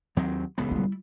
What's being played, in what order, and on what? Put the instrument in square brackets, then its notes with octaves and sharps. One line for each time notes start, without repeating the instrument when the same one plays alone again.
[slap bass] D#2 F#3 C4
D#1 C#2 B3
[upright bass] G3 E4